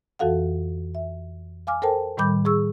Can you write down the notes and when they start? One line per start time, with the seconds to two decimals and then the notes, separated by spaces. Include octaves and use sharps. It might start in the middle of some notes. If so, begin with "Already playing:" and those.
0.19 F2 E3 F#4 A4 F5 F#5
0.95 E5
1.67 F5 G#5 D6 F6
1.82 A4 A#4 C5 G5 A5
2.17 A2 D#3 G3 B5 D6 G6
2.45 G#4 C#6 E6